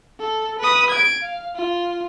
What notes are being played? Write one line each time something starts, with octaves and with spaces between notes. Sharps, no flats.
A4
B4 D#6
G#6 D7
F5
F4